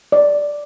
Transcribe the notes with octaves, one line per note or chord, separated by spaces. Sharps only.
D5